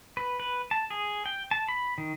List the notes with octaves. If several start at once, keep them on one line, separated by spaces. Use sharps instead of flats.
B4
B4
A5
G#4
G5
A5
B5
D#3